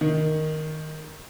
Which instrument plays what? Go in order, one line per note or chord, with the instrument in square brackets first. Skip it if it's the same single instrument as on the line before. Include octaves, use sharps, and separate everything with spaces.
[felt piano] D#3